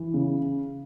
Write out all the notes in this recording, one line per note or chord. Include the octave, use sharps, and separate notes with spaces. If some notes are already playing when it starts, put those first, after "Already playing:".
Already playing: E3
C#3